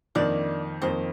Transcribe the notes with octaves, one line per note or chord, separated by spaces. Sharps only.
F2 D#3 A#3 D4 D5
F2 D#3 A#3 C4 C5